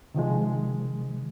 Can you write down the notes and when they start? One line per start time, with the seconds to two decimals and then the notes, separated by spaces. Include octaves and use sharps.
0.14 C3 D#3 F3 G#3